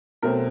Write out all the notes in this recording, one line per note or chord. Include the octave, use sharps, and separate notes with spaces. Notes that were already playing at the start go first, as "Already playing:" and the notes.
B2 F#3 A3 C4 A#4